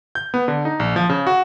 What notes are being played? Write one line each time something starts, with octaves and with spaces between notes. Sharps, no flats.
G6
B3
D3
D#4
A#1
F3
C#3
F#4